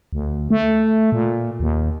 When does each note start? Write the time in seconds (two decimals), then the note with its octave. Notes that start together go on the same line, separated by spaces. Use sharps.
0.13 D2
0.50 A3
1.12 A#2
1.60 D#2